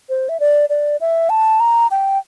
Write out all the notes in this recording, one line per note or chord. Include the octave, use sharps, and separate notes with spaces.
C5
E5
D5
D5
E5
A5
A#5
G5